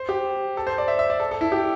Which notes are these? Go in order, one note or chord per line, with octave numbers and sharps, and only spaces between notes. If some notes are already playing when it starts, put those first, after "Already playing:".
Already playing: C5
G4
A4
C5
D5
E5
E5
D5
A4
A4
E4
G4